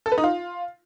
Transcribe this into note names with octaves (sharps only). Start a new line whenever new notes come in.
A4
B4
D#4
F4